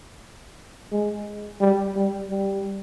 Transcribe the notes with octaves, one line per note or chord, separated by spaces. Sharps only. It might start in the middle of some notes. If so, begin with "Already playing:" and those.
G#3
G3
G3
G3